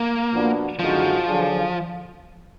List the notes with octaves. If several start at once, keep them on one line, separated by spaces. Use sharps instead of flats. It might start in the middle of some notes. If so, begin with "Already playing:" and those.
Already playing: A#3
A#2 F3 B3 D4 F#4
F#2 D3 F3 G#3 D#4 F#4
D3 F#3 D4 F4 G#4